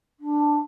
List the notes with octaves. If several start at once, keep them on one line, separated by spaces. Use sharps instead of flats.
D4